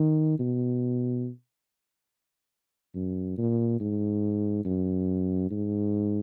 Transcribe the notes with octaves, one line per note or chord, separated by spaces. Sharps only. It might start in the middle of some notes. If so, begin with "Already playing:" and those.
Already playing: D#3
B2
F#2
A#2
G#2
F#2
G#2